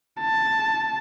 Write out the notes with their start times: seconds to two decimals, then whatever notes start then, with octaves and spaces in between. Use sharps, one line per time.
0.21 A5